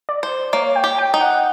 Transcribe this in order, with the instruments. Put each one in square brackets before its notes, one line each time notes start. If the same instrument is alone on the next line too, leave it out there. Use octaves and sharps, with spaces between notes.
[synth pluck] D5
[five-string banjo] C5
[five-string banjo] A#3 [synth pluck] C#5
[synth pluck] G5
[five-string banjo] G4
[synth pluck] G5
[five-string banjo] D#4
[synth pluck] F#5